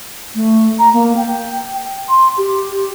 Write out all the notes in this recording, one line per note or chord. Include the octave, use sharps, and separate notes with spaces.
A3
A#5
A#3
G5
C6
G4